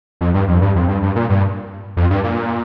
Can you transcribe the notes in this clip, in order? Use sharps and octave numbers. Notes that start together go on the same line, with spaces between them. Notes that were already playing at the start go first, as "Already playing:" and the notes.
F2
G2
F2
G2
F2
G2
G2
A#2
G2
F2
G2
A#2